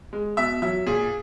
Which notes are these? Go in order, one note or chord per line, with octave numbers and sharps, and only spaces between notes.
G#3
B2 E5
F#3 E5
A#2 G#4